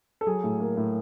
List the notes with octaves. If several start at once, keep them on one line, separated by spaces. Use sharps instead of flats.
A4
F#3 G#4
A2
A#3
A2